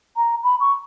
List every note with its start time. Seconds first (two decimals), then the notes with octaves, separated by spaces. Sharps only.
0.17 A#5
0.43 B5
0.60 C#6